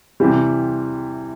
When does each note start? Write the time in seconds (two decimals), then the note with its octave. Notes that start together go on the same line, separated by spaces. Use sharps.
0.20 C3 E3 G3